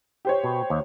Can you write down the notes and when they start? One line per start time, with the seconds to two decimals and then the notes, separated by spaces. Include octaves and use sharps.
0.25 G4 C5 C#5
0.44 B2
0.70 D#2